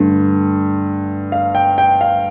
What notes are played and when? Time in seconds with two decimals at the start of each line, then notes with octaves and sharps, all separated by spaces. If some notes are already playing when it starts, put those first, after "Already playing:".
Already playing: G2 D3 A3
1.32 F5
1.55 G5
1.78 G5
2.01 F5